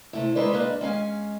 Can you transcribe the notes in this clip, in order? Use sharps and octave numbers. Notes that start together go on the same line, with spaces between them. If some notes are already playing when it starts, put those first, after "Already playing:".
C3 A3 E4
G#3 D#4 A4 B4 C5 D5
G#3 A#3 D4 B4
G#3 C#4 F5 G#5